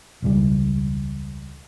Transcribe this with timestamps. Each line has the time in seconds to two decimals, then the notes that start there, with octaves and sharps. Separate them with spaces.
0.22 E1 C#2 G3